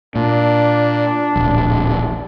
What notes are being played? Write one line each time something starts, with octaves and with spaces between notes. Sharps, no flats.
A#2 D4
D1 A#1